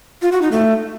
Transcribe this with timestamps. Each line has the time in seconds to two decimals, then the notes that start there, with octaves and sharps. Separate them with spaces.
0.22 F4
0.32 F#4
0.42 D#4
0.52 A3